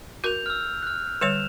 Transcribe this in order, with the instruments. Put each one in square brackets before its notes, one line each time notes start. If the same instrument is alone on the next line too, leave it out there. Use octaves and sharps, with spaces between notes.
[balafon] F#4 A#4 [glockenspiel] G6 F7
[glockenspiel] E6 F6
F6 F#6
[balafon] D3 G3 C#5 [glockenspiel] E7 F7